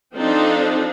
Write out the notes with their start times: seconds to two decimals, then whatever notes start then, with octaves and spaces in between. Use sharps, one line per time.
0.15 F3 C4 D4 D#4 A4